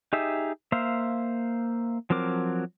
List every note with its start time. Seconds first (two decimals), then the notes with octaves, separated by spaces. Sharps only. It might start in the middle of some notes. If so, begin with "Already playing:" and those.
0.13 D#4 G4 G#4 E5
0.72 A#3 C5 E5 F5
2.10 F3 F#3 C4 A#4 D6